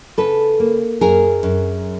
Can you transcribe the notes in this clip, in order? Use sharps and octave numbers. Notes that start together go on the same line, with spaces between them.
C#3 A4 B4
A#3
F#2 G#4 A#4
F#2